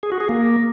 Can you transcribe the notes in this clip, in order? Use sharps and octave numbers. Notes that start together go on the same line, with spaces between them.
G#4
F#4
G#4
A#3